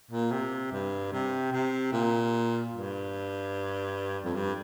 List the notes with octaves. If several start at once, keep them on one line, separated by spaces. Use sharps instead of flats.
A#2
C3
G2
C3
C3
A#2
G2
F2
G2